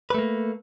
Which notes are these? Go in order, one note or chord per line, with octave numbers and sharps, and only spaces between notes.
A3 A#3 B4